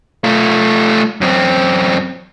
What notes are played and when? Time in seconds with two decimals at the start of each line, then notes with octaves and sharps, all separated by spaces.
0.24 A3 F4
1.21 F#2 C4